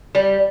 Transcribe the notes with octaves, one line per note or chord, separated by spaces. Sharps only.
G3